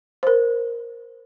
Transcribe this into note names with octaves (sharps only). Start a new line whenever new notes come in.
A#4 C5